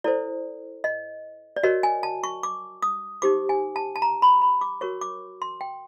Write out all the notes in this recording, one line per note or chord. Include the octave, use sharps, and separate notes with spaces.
E4 A4 C5 D5
D#5
D5
F#4 A#4 C#5 D#5
G#5
A5
C#6
D6
D#6
D#4 G4 C5 D6
G#5
A5
A5
A#5
B5
B5
D6
F#4 A#4 C#5 C#6
D6
C6
G5